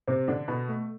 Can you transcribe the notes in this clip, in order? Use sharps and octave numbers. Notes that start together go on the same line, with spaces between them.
C3 C4
D3 D4
B2 B3
A3